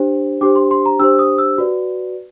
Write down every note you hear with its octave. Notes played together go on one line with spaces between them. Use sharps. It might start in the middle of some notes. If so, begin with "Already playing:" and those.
Already playing: D4 G4 C5
D4 G4 C5 D6
C6
C6
A#5
D4 G4 C5 E6
D#6
E6
F#4 B4 D5